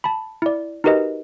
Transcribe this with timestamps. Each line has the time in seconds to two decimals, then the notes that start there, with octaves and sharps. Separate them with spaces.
0.04 A5 B5
0.42 E4 D5
0.84 D#4 F#4 G4 A#4 B4 D#5